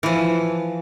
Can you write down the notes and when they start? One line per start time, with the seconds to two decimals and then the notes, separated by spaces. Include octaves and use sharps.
0.03 E3 F3